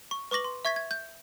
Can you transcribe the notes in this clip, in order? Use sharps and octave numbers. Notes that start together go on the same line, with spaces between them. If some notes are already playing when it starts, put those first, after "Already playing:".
C#6
B4 C#6 D6 A#6 F#7
C6
E5 C#6 G#6 A6 B6
G#6
G6